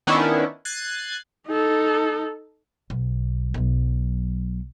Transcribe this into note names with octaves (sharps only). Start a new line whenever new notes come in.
D#3 B3 C#4 D4 E4
F#6 G#6 A6 C7 D#7
D#4 A4
B1
B1 F#3